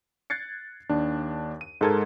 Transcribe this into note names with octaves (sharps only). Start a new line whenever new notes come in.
F#6 G#6 A6 C7 C#7
D#2 D4
D#7
G#2 G#3 A4 A#4 G#6